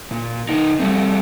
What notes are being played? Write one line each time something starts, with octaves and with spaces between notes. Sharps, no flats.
A#2
C#3 D#4
G3 A3 C4